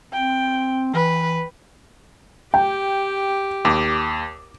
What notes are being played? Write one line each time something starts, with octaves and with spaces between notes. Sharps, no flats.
C4 G5
E3 B4
G4 G5
D#2 D6